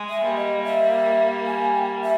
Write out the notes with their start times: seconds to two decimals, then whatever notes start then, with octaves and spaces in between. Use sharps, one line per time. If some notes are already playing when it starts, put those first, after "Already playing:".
Already playing: G#3
0.09 E5
0.23 G3 A#3
0.37 D#5
0.64 E5
1.46 G#5
1.74 G5
2.02 E5